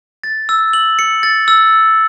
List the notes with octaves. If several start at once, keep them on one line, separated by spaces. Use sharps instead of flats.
A6
E6
F#7
C#7
A6
E6